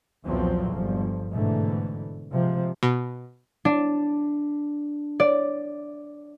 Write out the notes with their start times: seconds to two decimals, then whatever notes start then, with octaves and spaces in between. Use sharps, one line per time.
0.25 B1 E2 A#2 F3 F#3 C4
0.71 G1 F3
1.31 G#2 B2 D3 E3 A3
2.32 C3 F3 G#3
2.83 B2
3.65 D4
5.20 D5